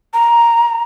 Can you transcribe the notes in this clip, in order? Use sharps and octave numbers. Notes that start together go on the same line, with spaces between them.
A#5